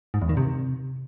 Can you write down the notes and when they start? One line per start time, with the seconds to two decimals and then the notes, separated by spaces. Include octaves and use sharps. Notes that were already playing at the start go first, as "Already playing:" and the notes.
0.14 G#2
0.22 E2
0.29 D#3
0.37 C3